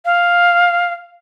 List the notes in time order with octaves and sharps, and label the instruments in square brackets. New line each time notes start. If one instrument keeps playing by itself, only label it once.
[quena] F5